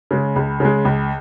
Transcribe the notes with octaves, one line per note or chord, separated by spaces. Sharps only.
C#3 G#3
C#2
C#3 G#3
C#2